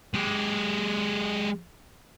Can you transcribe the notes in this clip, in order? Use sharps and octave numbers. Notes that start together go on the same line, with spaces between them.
G#3 G4